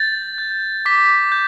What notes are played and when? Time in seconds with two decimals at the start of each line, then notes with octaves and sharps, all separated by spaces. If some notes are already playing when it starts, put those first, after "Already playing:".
Already playing: G6 A6
0.38 G6
0.86 D6 B6
1.32 G6